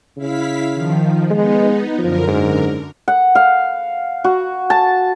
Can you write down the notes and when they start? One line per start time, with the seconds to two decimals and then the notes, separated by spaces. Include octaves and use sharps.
0.17 C#3 E4 F5 B6
0.73 D#3 F3
1.30 G#3 B3 D#4
1.98 F#2 D3 F3 A#4
2.27 G#2
3.08 F#5
3.35 F5
4.24 F#4
4.70 A5